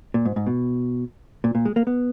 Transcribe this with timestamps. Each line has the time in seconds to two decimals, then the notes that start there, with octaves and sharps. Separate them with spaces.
0.14 A#2
0.25 G#2
0.36 G#2
0.47 B2
1.44 A#2
1.55 A#2
1.65 G#3
1.76 A#3
1.87 B3